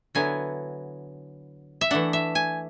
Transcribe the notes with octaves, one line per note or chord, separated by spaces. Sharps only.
D3 F#3 B3 E4 G#5
E5
E3 A3 D4 F#5
E5
G#5